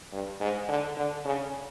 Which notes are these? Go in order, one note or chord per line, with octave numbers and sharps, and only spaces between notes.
G2
G#2
D3
D3
C#3